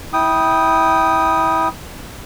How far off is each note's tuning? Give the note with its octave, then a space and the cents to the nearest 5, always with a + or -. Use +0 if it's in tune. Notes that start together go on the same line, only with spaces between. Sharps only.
E4 -20 G5 -5 D#6 +0